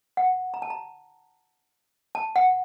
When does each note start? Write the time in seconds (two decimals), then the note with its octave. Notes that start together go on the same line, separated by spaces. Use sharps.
0.17 F#5
0.54 A#5
0.62 A5
0.70 A#5
2.15 A5
2.36 F#5